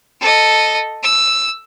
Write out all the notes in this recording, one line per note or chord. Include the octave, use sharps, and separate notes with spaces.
A4 D#5
E6